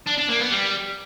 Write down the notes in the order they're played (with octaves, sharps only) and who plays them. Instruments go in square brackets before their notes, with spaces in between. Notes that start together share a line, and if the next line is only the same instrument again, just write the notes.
[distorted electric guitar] D4
D4
A#3
B3
G3